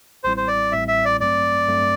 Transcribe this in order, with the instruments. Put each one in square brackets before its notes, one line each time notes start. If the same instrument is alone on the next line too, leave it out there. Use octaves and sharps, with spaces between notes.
[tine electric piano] A1 A2 G3 C4 E4 [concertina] C5
[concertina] C5
D5
[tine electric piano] A1 A2 G3 C4 E4 [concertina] E5
[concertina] E5
D5
[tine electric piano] G2 F#3 A3 C4 [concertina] D5
[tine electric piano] G2 F#3 A3 C4